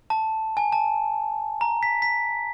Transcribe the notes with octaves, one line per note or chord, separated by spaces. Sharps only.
A5
G#5
A5
A#5
B6
B6